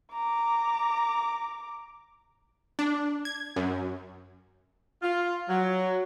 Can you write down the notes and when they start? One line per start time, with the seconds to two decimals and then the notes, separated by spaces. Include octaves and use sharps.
0.13 A#5 D6
2.79 D4
3.25 G#6
3.56 F#2
5.03 F4
5.49 F#3